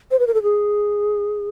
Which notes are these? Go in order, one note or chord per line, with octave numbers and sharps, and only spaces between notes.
C5
B4
A#4
A4
G#4